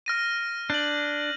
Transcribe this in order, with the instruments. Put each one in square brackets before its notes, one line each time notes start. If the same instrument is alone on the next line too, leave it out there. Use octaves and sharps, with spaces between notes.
[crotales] F6 A#6 D#7
[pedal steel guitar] D4 [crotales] G6 F#7